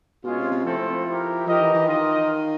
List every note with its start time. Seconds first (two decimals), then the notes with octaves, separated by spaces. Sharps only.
0.24 B2 G#3 C#4 F4
0.37 C3
0.51 C3
0.65 F3 A3 C4 E4 A4 C5
1.06 E4 G4 A#4
1.46 F3 D#4 G4 A#4 D#5
1.61 E3
1.74 E3
1.88 D#3 F4 A#4 D#5